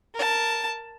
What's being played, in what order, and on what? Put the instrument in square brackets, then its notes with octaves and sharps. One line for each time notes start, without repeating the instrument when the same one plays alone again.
[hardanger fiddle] A#4 A5